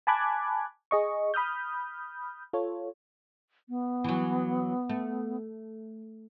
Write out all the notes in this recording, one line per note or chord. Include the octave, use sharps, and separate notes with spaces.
G#5 A5 B5 D6 F#6 G#6
G#4 D#5 C#6
B5 D#6 F6 G6
F4 A4 C#5
B3
E3 F#3
A3